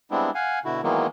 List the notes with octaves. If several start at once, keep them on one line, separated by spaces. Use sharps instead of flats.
G3 G#3 B3 C4 D4 E4
F5 F#5 G#5
B2 D3 E4 F#4
D#3 E3 F#3 G#3 A#3 B3